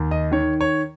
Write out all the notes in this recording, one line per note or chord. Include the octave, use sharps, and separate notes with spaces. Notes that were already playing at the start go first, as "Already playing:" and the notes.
Already playing: D#2
D#5
D#3 C#5
C#5